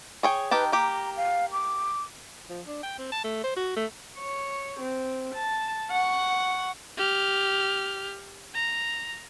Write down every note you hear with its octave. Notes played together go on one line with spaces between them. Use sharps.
G#4 C#5 G5
D#3 G4 B4 A5
A#3 G4 A#5
F5
D6
F3
D4
G5
C4
A5
A3
C5
F#4
A3
C#5
C4
A5
F#5 C#6
G4 F6
A#5